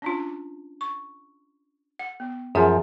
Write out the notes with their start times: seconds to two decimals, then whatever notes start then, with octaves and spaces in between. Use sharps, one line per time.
0.02 C#4 D4 F4
0.81 C#6
1.99 F#5
2.20 B3
2.55 F#2 F3 G#4 E5 G#5